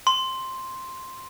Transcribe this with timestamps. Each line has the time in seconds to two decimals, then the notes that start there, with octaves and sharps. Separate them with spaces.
0.07 C6